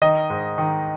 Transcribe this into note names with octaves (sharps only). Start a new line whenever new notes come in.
D#3 D#5
G#2
D#3